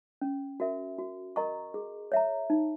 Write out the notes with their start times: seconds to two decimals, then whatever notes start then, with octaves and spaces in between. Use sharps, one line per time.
0.22 C#4
0.60 F#4 A#4 E5
0.98 F#4
1.36 A#4 D#5 A#5 C#6
1.74 G#4
2.12 C#5 E5 A#5
2.50 D#4